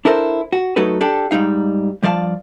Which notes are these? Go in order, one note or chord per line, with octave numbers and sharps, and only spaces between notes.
D4 E4 A4 A#4 C5
F#4
F#3 A3 D#4 F#4 A4 B4
D4 G4 A4
G#2 G3 D#4 F5
G2 F3 D5 F5 A5